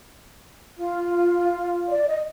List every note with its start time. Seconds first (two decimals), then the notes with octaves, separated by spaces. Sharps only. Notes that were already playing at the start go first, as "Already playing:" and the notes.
0.77 F4
1.89 D5
2.08 D#5